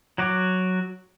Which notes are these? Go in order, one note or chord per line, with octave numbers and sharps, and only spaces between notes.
F#3 F#4 D6